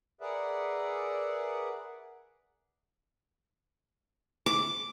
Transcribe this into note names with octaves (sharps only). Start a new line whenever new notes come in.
G#4 A#4 B4 D5 E5 F#5
D6